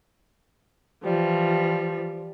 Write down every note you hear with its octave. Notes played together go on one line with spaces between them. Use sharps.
E3 F3 G3